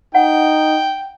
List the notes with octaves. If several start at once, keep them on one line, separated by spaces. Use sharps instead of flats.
D#4 F#5 G5